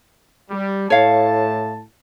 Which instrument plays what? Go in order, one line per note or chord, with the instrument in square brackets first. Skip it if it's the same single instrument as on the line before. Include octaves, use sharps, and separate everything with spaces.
[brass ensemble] G3
[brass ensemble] A2 A5 [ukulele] C#5 F5